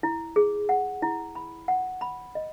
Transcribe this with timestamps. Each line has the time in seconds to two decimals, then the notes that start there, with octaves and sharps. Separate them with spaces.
0.03 E4
0.36 G#4
0.69 F#5
1.02 E4
1.35 B5
1.68 F#5
2.01 B5
2.35 D#5